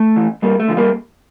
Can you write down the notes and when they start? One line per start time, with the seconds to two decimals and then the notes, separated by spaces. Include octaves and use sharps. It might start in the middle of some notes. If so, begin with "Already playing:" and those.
Already playing: A3
0.16 E3
0.42 G2 G3 A#3
0.60 A3
0.68 D3 F3
0.77 G3 A#3